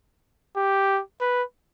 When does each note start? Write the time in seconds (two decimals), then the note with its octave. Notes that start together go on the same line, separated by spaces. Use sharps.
0.56 G4
1.20 B4